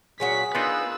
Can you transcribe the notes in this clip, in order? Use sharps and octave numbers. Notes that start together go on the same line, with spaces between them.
A#2 F#3 F#4 G#4 B6
B3 D4 D#4 F4 A#4 B4 E6